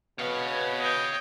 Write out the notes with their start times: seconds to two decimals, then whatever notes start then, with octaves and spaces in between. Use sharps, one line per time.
0.19 B2 B3 C#5 F5
0.80 D#5 G5